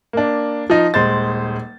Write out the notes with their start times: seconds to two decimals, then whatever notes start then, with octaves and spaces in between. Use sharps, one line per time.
0.13 A#3 D4
0.70 F3 D#4
0.94 D#1 G#3 C5 A6